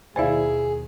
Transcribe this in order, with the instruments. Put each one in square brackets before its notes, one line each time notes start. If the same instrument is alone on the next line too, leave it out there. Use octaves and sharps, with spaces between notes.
[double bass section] D#2 B2 [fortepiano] E4 G#5 [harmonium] G#4 [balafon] C5 D5 F5